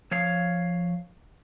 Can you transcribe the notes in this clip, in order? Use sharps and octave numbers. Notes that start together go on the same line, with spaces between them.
F3 C#5 F5